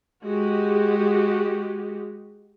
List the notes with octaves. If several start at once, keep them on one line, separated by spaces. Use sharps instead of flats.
G#3 F#4 G4